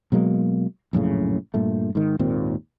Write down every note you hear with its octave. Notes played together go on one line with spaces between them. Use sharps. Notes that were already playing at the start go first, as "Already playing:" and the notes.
B2 F#3 G#3 A#3
A#1 F#2 A2 C#3
G2 A#2 A3
G#2 D#3
G#1 D#2 A#2 C4